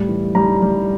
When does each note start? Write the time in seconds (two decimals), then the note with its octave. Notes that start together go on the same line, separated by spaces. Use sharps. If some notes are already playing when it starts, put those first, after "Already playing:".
Already playing: A2 G3
0.09 E3
0.35 G3 A#5
0.62 G3